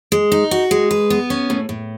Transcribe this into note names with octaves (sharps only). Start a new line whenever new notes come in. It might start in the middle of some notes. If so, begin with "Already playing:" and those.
G#3
D#4
F#4
G#3
B4
B3
C#4
A2
A2